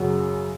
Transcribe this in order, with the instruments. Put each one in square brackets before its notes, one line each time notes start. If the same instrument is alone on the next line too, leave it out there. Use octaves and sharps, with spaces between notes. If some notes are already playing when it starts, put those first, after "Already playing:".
Already playing: [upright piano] F#2 C#3 F#3